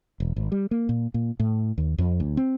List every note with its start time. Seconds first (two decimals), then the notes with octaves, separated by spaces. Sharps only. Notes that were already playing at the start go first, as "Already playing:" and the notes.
0.20 E1
0.36 G#1
0.52 G3
0.71 A#3
0.89 A#2
1.14 A#2
1.40 A2
1.78 D#2
1.98 F2
2.20 D2
2.37 C4